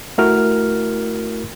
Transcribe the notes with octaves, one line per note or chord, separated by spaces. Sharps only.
A3 E4 F#4 A#4 F6